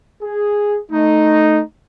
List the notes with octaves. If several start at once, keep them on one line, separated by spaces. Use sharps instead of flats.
G#4
A3 D#4